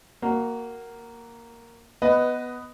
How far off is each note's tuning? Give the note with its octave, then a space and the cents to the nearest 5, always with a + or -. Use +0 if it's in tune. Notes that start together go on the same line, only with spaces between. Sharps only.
A#3 +0 F#4 +15
B3 +0 B4 +15 D#5 +0